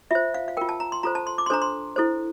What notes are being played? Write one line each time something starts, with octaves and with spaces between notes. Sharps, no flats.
F4 C5 E5
F5
F5
F4 A#4 G5
A5
A#5
C6
F4 A4 C5 A#5
A5
C6
D6
C6
D4 A4 C5 A#5
C6
E4 A4 C5